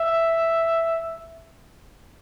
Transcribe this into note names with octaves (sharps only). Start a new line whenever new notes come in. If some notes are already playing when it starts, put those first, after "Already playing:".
Already playing: E5